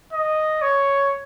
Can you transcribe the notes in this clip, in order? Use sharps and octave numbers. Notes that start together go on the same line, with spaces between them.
D#5
C#5